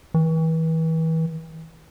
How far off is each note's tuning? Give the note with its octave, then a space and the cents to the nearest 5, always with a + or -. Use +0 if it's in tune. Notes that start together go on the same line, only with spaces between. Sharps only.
E3 -35